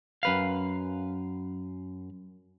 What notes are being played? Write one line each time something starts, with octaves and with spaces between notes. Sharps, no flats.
F#2 B4 F5